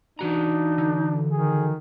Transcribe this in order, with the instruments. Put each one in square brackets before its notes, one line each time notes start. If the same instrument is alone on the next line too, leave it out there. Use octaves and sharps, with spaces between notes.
[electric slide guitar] E3 F#4 A#5 [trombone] D4 [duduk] D#4
[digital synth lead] D3
[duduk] D#3 [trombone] G#4